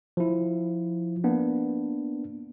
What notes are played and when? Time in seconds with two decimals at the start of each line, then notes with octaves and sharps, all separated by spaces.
0.17 F3 E4
1.24 A#3 B3 D4